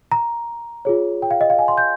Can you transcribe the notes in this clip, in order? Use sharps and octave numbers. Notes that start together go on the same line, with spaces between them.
A#5
F4 G#4 C#5
G5
F5
D#5
F5
G#5
C6
G6